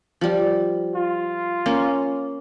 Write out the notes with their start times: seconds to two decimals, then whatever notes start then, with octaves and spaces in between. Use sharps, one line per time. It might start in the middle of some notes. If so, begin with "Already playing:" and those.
0.21 F3 G3
0.95 F4
1.66 A#3 C#4